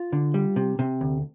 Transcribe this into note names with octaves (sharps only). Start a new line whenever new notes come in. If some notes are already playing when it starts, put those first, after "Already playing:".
Already playing: F4
D3
G3
C3
C3
D2